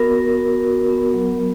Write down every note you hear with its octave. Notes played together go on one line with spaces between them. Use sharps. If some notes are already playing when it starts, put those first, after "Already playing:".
Already playing: B3 F#4 A#4
B3
F#4
F#4
B3
F#3
F#3